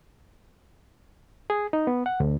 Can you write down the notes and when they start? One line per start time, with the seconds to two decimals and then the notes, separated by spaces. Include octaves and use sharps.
1.50 G#4
1.73 D#4
1.87 B3
2.06 F#5
2.20 D2